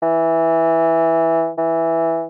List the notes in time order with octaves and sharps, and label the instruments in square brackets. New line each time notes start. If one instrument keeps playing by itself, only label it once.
[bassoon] E3
E3